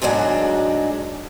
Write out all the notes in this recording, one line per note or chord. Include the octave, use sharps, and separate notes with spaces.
D2 G#2 F#3 G#3 D4